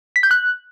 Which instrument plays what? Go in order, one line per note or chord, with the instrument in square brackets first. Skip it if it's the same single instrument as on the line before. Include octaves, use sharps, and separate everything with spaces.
[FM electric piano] B6
G6
F#6